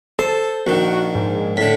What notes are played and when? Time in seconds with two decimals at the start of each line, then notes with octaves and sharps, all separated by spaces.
0.19 A4 C5
0.67 A#1 D#3 F#4
1.15 G#2
1.57 A2 D3 B6